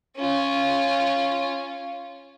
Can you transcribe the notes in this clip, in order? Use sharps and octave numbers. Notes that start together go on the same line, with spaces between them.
C#4 F4